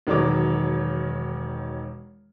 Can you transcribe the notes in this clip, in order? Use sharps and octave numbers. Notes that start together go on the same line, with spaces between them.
E1 D#3 F#3 C#5 D6